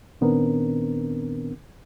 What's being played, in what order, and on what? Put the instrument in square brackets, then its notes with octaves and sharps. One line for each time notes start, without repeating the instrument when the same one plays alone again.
[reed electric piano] A#2 D#3 B3 C4 D4 A#4